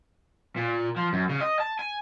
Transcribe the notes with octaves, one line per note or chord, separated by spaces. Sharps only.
A#2
F3
F#2
C#3
D#5
A5
G#5